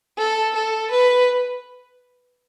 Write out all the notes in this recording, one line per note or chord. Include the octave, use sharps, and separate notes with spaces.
A4
A4
B4